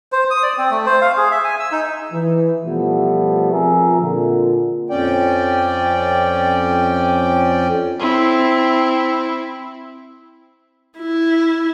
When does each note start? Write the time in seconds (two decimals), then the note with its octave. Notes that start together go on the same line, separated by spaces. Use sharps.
0.12 C5
0.30 D#6
0.43 D5
0.58 C4
0.70 A3
0.86 C5
1.02 F5
1.17 G#4
1.31 E5
1.44 G#5
1.59 E6
1.72 D#4
2.12 E3
2.64 B2 F3 G3 A3 B3
3.52 F3 C4 G#4 A#4 E5
4.00 A#2 D3
4.90 F2 C#4 D5 G5
8.00 C4 E4
10.98 E4